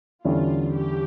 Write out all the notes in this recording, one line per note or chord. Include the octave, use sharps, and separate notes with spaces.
E2 D3 G3 C#4 E4 F4
G4